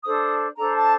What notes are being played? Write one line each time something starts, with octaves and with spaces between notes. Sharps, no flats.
D4 A4 C5 D#6
D4 A4 C5 A#5
A5